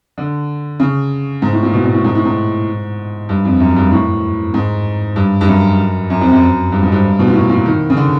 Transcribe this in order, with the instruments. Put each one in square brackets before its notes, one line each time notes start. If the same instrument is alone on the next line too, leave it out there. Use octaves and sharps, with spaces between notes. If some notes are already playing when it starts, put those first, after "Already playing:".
[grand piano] D3
C#3
G#2
A2
A#2
B2
A#2
A2
G#2
A2
G#2
G2
F2
F#2
G2
A2
G#2
G2
G2
F#2
F#2
F2
F#2
G2
G#2
G2
B2
A#2
A2
A#2
D#3
C#3
D3